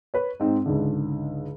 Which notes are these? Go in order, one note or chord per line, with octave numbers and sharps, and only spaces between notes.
B4 C#5
G#2 C4 D#4
C#2 G#2 D3